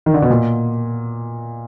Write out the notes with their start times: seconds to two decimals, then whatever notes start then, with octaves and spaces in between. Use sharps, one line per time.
0.06 D#3
0.14 D3
0.22 B2
0.30 A#2